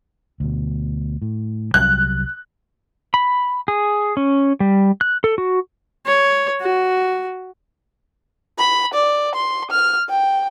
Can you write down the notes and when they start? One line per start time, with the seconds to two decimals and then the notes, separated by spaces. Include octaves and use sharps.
0.40 D2 B2
1.22 A2
1.74 C2 F#3 G3 F#6
3.14 B5
3.68 G#4
4.17 C#4
4.60 G3
5.01 F#6
5.24 A4
5.38 F#4
6.06 C#5
6.61 F#4
8.59 B5
8.94 D5
9.35 C6
9.71 F6
10.09 G5